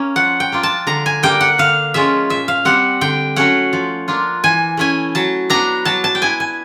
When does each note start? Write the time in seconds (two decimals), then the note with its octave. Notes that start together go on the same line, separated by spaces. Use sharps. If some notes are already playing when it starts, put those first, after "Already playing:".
Already playing: A#3 C#4
0.16 F3 F#5
0.40 G5
0.52 A#3 D4 F4
0.63 A5
0.87 D3 A#5
1.06 G#5
1.23 G3 A#3 D4 G5
1.41 F#5
1.58 D3 F5
1.94 F3 G#3 C#4 F4 E5
2.30 A#2 E5
2.48 F5
2.65 G3 C4 F#5
3.01 D3 G5
3.36 F#3 A3 C#4 F#5
3.73 F3
4.08 A#3 D4 F4
4.44 E3 G#5
4.77 A3 C#4 E4 G#5
5.15 F#3 A5
5.50 B3 D4 A#5
5.85 F#3 A5
6.04 A5
6.15 G5
6.22 B3 E4 G#5
6.40 G#5